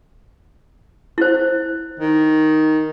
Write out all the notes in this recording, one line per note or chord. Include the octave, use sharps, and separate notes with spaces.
E4 C5
D#3